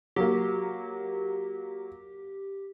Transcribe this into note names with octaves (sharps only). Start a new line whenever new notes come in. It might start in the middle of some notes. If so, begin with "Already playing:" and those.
F#3 A#3 G4